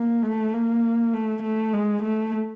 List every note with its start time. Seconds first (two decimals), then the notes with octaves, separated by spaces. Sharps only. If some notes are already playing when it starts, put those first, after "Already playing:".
Already playing: A#3
0.23 A3
0.54 A#3
1.13 A3
1.43 A3
1.73 G#3
2.03 A3